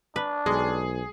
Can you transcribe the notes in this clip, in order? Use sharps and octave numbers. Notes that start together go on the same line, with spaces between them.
D4 B4
B1 G#3 G#4